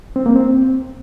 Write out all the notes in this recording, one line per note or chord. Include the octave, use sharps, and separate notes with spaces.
C4
A#3
C4